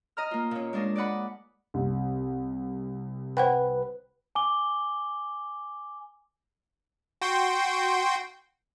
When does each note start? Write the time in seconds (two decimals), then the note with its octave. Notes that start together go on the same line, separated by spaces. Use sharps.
0.17 D#5 A#5 F6
0.31 A#3 F4
0.51 A#2 C#4
0.73 G#3 A#3 D4 G#4 A#4
0.96 D5 D#5 F#5 B5
1.74 C2 C3
3.37 B4 C5 F#5 G5
4.35 G#5 D6 G7
7.22 F#4 G5 C6